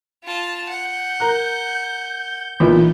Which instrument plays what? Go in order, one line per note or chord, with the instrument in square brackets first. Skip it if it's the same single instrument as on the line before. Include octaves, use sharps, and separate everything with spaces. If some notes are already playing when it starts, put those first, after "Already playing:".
[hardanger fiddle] F4 A5
[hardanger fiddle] F#5 [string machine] G6
[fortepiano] A#4 A#5 F#6
[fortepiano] B1 E4 B4 [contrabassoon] A#2 [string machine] E3 B3 D#4